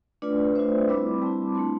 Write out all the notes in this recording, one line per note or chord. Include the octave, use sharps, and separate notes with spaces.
A3 D4 F4 B4 D5
A3 D4 F4 C5 E5
G3 C4 E4 B5 D6
G3 C4 E4 A5 C6
A3 D4 F4 A5 C6